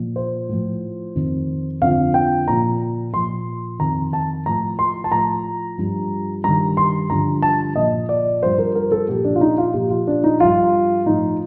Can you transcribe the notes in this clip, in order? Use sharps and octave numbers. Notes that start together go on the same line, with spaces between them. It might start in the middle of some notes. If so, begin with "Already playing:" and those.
Already playing: A#2 F3
C5
A2 F3
F2 D#3
F2 D3 F3 F5
G5
A#2 F3 A#5
A#2 F3 C6
F2 D#3 A#5
A5
A2 F3 A#5
C6
A5
A2 F3 A#5
G2 F3
G2 D#3 A#5
C6
G2 D3 F3 A#5
A5
A#2 F3 D#5
D5
G2 F3 C5
A#4
A#4
A4
A#2 F3 G4
D4
F4
D#4
F4
A#2 F3 G4
F4
D4
D#4
G2 F3 F4
A2 F3 D#4